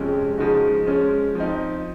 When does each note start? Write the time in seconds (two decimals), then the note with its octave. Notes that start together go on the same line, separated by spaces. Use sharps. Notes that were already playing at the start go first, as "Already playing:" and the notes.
Already playing: F2 C3 F3 G#3 C#4
0.38 C#3 F3 G#3 D#4 F#4
0.86 F3 G#3 C#4
1.35 F3 C4 D#4